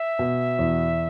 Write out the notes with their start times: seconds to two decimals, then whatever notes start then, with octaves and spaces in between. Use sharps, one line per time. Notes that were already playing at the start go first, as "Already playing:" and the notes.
Already playing: E5
0.19 B2
0.59 E2